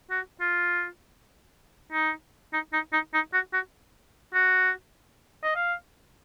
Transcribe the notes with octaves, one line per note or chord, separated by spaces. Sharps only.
F#4
F4
D#4
D#4
D#4
D#4
D#4
F#4
F#4
F#4
D#5
F5